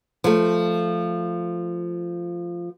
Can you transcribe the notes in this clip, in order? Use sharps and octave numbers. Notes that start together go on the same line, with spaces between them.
F3 A3